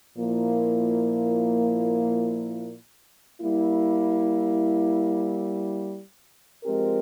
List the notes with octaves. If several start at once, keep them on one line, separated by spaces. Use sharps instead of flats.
A#2 F3 A#3 E4
G3 A#3 E4
F3 G#3 C4 G4 A#4